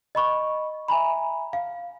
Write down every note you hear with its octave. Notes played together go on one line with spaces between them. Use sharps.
D#5 B5 C#6
E5 G#5 A#5 B5
F5